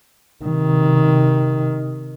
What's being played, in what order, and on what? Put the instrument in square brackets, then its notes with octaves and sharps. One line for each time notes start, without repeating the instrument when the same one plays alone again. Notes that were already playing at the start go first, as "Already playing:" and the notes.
[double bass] C3 D#3